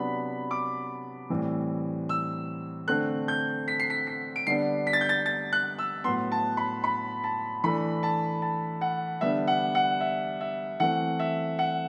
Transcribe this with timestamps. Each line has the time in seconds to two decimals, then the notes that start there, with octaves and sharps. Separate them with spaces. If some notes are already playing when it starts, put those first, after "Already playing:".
Already playing: C3 F#3 B3 D4 B5
0.51 D6
1.30 A2 E3 G3 C4
2.09 E6
2.88 D3 A3 C4 F#6
3.28 G6
3.68 B6
3.80 C7
3.90 B6
4.07 B6
4.36 D7
4.47 D3 G3 B3 D4 C7
4.87 B6
4.93 A6
5.01 G6
5.09 A6
5.26 A6
5.53 F#6
5.78 E6
6.04 A2 F#3 B3 C6
6.32 A5
6.57 B5
6.84 B5
7.24 A5
7.64 E3 A3 D4 B5
8.03 A5
8.42 A5
8.81 F#5
9.21 D3 G3 B3 D4 E5
9.47 F#5
9.75 F#5
10.00 E5
10.41 E5
10.80 E3 A3 C4 F#5
11.19 E5
11.59 F#5